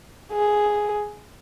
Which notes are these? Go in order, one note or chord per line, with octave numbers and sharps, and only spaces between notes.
G#4